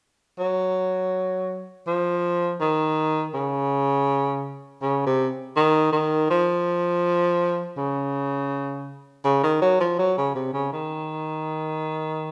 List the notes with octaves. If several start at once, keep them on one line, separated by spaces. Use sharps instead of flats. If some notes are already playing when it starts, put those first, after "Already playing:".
F#3
F3
D#3
C#3
C#3
C3
D#3
D#3
F3
C#3
C#3
D#3
F#3
F3
F#3
C#3
C3
C#3
D#3